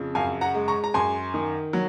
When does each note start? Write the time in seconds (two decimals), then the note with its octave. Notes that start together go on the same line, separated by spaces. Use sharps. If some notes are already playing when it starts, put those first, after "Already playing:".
Already playing: F2 C#3
0.15 F#2 F5 G#5
0.41 F#5 A#5
0.54 G#3
0.68 A#5 C#6
0.84 A#5
0.94 F#2 G#5 C6
1.34 D#3
1.73 F#3